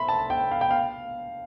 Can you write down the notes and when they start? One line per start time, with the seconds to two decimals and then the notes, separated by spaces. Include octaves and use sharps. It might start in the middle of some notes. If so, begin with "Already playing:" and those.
Already playing: E5 B5 C6
0.08 A5
0.30 G5
0.51 F5
0.61 G5
0.71 F5